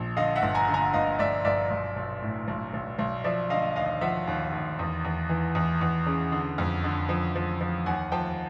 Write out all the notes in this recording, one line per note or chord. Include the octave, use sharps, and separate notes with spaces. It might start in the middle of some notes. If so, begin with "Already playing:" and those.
Already playing: A#1
D3 D#5 F5
E5 F#5
G1
G#5 A#5
D3
G#5 A#5
G1 D#5 F5
G1 D5 E5
G1 D5 E5
B1
B1
A2
B1
B1
B1
F3 D5 E5
D3 D#5 F5
D#2 D#5 F5
F3 E5 F#5
D#2
D#2
E2
E2
E3
E2
E2
C#3
D3
F2
D3
F3
F3
F3
D#2 F#5 G#5
F3 G5 A5